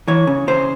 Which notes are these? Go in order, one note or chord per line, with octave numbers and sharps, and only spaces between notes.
E3 C#5
C#3
C#3 C5